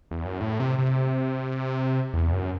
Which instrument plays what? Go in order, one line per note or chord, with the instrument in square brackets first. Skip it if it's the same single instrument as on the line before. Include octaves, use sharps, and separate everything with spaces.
[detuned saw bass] E2
F#2
A2
C3
C3
E2
F#2